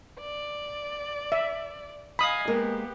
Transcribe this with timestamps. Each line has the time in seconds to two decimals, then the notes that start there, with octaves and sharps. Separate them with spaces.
0.19 D5
1.32 E5
2.19 D#5 F5 G#5 B5 D#6
2.47 G#3 A#3 B3 G4 A#4